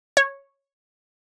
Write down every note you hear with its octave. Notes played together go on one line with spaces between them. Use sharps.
C#5